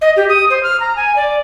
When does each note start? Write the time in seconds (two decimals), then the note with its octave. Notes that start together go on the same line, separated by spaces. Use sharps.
0.01 D#5
0.16 G4
0.29 D#6
0.50 C5
0.63 F6
0.80 A#5
0.96 G#5
1.16 D5